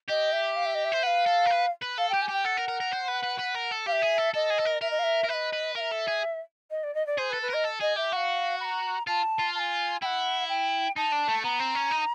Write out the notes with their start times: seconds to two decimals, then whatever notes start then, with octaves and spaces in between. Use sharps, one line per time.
0.08 G4 D#5
0.32 E5
0.56 F5
0.65 E5
0.74 D#5
0.84 E5
0.92 C5
1.03 B4 F#5
1.06 F5
1.26 A4
1.46 A#4
1.50 B4
1.82 B4
1.98 A4 F5
2.09 G4 G5
2.22 G#5
2.29 G4 G5
2.45 A4 F#5
2.57 A#4
2.68 A#4
2.80 A#4
2.93 C5
3.09 B4
3.24 B4
3.39 B4
3.55 A#4
3.72 A4
3.86 G4 F5
3.92 E5
4.02 G#4
4.18 A4
4.34 A4 D#5
4.50 G#4
4.58 A4
4.65 A#4
4.81 A#4 E5
4.90 D#5
4.99 F5
5.03 E5
5.24 A#4
5.29 B4 D#5 E5
5.53 B4
5.75 A#4 F5
5.80 E5
5.92 A4
6.08 G#4
6.70 D#5
6.83 D5
6.94 D#5
7.06 D5
7.18 G#4 C5
7.30 B4
7.34 A4
7.42 B4
7.50 A#4 D#5
7.65 A4
7.81 G#4 D#5
7.97 G4 E5
8.13 F#4 F5 F#5
8.60 B5
8.64 A#5
9.07 F4 A5
9.39 F4
9.54 A5
9.59 G#5
10.02 E4 F#5 G5
10.49 G5
10.96 D#4 A5
11.12 D4
11.28 A3
11.44 B3 A#5
11.59 C4
11.75 C#4
11.91 D#4